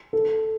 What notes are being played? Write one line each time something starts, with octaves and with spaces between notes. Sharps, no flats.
A4